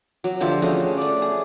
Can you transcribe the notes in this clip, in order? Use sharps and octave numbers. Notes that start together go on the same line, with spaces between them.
F#3
D3 F3 G4 E5
A3 C#4 F#4 G#4
A3 D5
G#4